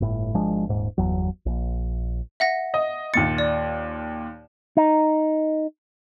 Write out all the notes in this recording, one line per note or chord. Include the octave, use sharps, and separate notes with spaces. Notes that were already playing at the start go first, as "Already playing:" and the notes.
G1 A2
G#1 F3 G#3 D4
D#1 G#2
G1 E2 F#3
A#1
E5 F#5 A#6
D#5
D#2 A#2 A6 C#7
D5
D#4